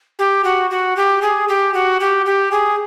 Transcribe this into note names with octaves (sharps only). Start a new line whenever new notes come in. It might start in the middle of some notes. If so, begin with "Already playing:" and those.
G4
F#4
F#4
G4
G#4
G4
F#4
G4
G4
G#4